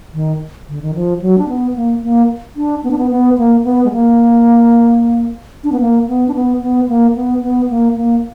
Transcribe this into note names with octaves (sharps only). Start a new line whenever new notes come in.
D#3
D3
D#3
F3
F#3
D4
B3
A#3
A#3
D4
B3
D4
B3
B3
A#3
B3
G#3
A#3
D4
B3
A#3
B3
D4
B3
B3
A#3
B3
B3
A#3
A#3